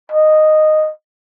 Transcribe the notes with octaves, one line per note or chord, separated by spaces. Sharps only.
D#5